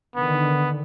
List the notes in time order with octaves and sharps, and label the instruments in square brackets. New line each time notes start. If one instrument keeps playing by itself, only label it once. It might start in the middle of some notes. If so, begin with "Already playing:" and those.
[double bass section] D3 D#3 [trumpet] B3